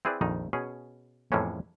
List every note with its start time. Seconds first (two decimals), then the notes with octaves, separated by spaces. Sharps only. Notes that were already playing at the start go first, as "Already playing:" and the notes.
0.05 C4 E4 G#4 B4 C5 D5
0.21 A#1 F2 D#3 D#4
0.53 B2 C#4 G#4
1.32 F2 A2 E3 G#3 A#3 C#4